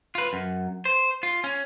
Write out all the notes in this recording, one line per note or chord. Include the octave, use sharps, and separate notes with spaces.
F4 B4
F#2
C5
F4
C#4